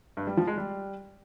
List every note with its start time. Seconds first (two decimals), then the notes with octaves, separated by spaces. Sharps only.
0.17 G2
0.27 G3
0.37 F3
0.47 G#3
0.58 G3